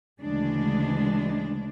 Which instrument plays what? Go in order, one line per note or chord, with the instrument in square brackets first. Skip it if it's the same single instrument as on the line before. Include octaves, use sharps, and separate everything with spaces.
[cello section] D2 C#3 E3 G#3 D4